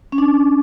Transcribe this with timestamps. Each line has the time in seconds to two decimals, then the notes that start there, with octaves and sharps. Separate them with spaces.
0.12 C#4
0.18 D4